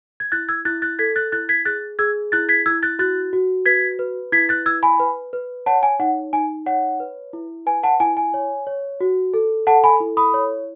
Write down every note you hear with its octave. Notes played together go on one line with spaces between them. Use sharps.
G#6
E4 F#6 A6
E6 G#6
E4 F#6 A6
F#6 A6
A4 G#6 B6
F#6 A6
E4 F#6 A6
G#6 B6
G#4 F#6 A6
G#4 E6 G#6
E4 F#6 A6
G#6 B6
E4 E6 G#6
F#6 A6
F#4 F#6 A6
F#4
B4 G#6 B6
B4
E4 G#6 B6
F#6 A6
E4 E6 G#6
G#5 B5
B4
B4
C#5 F#5 A5
G#5
D#4 F#5
D#4 G#5
C#5 F#5
B4
E4
B4 G#5
F#5 A5
E4 G#5
G#5
C#5
C#5
F#4
A4
A4 F#5 A5
G#5 B5
E4
B5 D#6
C#5